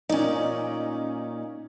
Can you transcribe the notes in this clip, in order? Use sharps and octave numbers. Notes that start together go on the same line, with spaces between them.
A#2 C#4 D#4 D5